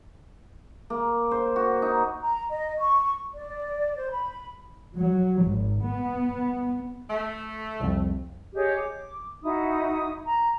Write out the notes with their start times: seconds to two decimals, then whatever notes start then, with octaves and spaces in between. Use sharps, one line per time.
0.90 A#3
1.31 C5
1.56 F#4
1.82 D#4
2.21 A#5
2.50 D#5
2.78 C#6
3.32 D5
3.96 C5
4.11 B5
4.97 F#3
5.45 G#1
5.83 B3
7.10 A3
7.80 C2 F2
8.54 G4 G#4 C#5 D#5
8.76 D6
9.44 D#4 E4 F#4 D#6
10.26 A#5